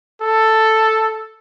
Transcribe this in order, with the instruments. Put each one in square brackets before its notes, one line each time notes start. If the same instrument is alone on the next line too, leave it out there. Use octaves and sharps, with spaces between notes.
[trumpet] A4